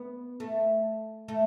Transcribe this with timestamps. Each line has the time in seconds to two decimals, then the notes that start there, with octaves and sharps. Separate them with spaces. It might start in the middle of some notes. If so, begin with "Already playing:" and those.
Already playing: B3
0.40 A3
1.28 A3